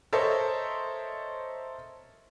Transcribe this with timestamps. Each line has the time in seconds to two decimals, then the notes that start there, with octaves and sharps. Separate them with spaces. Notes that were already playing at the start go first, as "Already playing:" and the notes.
0.13 A4 A#4 C5 C#5 D#5 E5